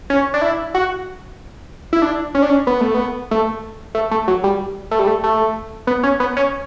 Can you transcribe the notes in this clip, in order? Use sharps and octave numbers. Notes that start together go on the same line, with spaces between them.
C#4
D4
E4
F#4
E4
D4
C#4
D4
C#4
B3
A3
B3
A3
A3
A3
F#3
G3
A3
G3
A3
A3
B3
C#4
B3
C#4